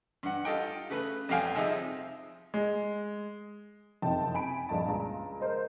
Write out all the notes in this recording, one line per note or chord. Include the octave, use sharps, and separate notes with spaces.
G2 F#5
F4 G4 A4 D#5 G5
C#3 A3 B4
F2 G3 A3 F5 G5 G#5
C3 F3 D#4 G#4 D#5 E5
G#3
F#1 F2 C3 D#4 G5 A5
G#5 B5 D7
A#1 G2 D#5 A5
C#2 A#5
A#4 C5 D#5